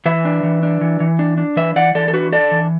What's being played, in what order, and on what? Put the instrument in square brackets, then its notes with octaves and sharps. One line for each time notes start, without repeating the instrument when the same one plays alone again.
[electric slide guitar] E3 B4 E5
D4
E3
D4
E3
E3
D4
D4
E3 B4 E5
E3 D5 F#5
E3 A4 D5
A4
D4 F#4 B4
D4 A4 D5
E3